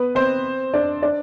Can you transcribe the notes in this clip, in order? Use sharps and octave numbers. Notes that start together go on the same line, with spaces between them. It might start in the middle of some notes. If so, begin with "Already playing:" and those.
Already playing: B3 B4
C4 C5
D4 D5
D4 D5